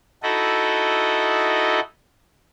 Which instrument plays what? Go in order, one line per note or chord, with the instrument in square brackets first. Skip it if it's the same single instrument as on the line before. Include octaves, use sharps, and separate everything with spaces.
[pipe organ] D#4 E4 F#4 A4 D#5